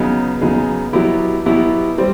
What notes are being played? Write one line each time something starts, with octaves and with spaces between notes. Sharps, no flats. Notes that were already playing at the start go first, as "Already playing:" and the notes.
Already playing: C#3 F#3 B3 D#4 G#4
C#3 F#3 B3 D#4 G#4
B2 F#3 B3 E4 G4
B2 F#3 B3 E4 G4
G3 C4